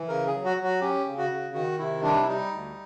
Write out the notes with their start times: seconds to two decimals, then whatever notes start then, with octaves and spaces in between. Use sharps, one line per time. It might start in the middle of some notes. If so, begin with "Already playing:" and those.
Already playing: E3
0.08 C#3 A#4
0.27 G#4
0.33 F#3
0.45 F#4
0.57 F#3
0.64 F#4
0.81 C#4 G4
1.06 C#3
1.18 F#4
1.30 C#3
1.54 D#3 F#4
1.79 C3 E4
2.03 G3 D4
2.22 E4
2.28 G3 D#4
2.52 D2